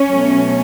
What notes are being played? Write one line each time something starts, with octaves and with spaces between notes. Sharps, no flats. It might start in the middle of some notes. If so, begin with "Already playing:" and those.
Already playing: C#4
B2 F#3 A3